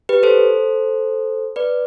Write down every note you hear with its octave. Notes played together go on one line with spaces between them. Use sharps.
G4 B4
A4 C5
B4 D5